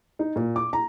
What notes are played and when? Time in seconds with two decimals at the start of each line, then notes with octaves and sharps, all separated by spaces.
0.19 D#4
0.36 A#2
0.56 D6
0.73 A#5